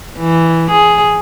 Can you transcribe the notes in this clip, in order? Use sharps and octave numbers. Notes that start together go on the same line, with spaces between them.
E3
G#4